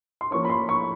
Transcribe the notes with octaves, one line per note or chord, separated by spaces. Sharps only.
C6
F3 A#3 C#4 C#6
B5
C6
C#6